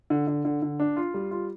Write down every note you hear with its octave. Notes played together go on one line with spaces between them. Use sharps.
D3
D3
D3
D3
D4
F4
G3
F4